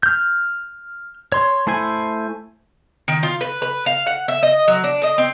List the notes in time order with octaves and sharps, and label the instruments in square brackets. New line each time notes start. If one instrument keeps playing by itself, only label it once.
[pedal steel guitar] F6 G6
C#5 C6
A3 E4 C5 G#5
[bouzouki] D#3
F4
B4
B4
F5
F#5
E5
D#5
F#3
D4
D#5
C4